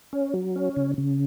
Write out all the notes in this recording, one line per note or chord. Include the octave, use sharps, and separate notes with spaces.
C#4
F#3
C#4
C#3
C#3